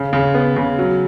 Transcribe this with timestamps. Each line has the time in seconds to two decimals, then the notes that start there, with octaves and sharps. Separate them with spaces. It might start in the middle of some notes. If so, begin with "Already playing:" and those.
Already playing: C#3
0.13 C#3
0.34 B3
0.56 C#3
0.79 F#3